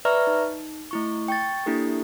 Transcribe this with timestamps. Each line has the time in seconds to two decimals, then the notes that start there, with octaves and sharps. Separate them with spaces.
0.05 B4 D5 E5 A#5 C#6 F6
0.27 D#4
0.91 A3 E4 C#6
1.28 G5 C#6 A6
1.66 A#3 D4 E4 G4 A4